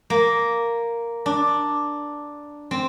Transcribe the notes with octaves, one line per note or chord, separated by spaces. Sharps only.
A#3
D4
C4